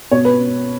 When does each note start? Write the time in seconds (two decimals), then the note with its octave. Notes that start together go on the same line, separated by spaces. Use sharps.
0.11 B2 C#5
0.25 B4